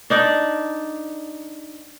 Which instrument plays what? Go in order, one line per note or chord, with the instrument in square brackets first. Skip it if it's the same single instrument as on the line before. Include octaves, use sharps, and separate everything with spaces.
[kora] D4 D#4 D5